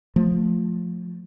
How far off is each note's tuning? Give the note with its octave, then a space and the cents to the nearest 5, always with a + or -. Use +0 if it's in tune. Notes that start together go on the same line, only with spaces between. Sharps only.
F3 +15 A3 +0